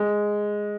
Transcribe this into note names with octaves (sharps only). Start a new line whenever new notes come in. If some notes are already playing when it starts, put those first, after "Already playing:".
Already playing: G#3